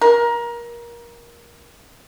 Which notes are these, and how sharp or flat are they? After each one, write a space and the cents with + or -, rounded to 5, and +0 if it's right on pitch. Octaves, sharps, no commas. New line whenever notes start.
A#4 +25